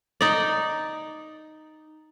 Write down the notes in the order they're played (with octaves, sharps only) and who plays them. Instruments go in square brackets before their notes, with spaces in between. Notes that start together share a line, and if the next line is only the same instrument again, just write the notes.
[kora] D#4 D5